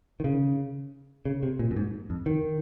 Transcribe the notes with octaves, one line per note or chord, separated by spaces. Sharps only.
D#3
C#3
C#3
C3
A#2
F#2
G#2
F2
D#3